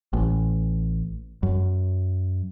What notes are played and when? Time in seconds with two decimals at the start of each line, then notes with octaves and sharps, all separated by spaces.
0.13 A1
1.43 F#2